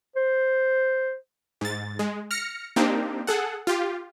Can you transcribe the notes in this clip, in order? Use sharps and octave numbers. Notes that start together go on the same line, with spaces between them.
C5
G#2 A6
G#3
F6 A#6 C#7
A#3 C4 D4 D#4 G4
G#4 A4 F#5
F4 G4